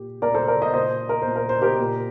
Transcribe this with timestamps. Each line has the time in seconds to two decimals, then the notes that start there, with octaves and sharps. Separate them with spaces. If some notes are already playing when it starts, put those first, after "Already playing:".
Already playing: A#2 G4
0.21 A#2 A#4 D5
0.34 A4 C5
0.48 A#4 D5
0.61 C5 D#5
0.74 A#2 C5 D#5
1.09 A#4
1.22 A#2 C5
1.36 A#4
1.49 C5
1.61 G4 A#4
1.79 A#2